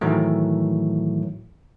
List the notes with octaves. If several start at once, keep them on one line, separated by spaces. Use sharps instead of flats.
A2 D#3 E3 F#3 A3